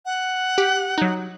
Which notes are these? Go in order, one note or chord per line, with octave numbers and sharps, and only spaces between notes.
F#5
G4
F#3 D#4